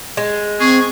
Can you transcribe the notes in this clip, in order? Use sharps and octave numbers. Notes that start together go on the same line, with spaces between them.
G#3
C4 G#4 C#6